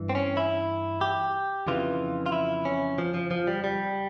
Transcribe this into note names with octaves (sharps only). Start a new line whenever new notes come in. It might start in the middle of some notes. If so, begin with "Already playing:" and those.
Already playing: G2 E3
C4
C#4
E4
G4
F2 C#3 E3 F4
F4
E4
C#4
F3
F3
F3
G3
G3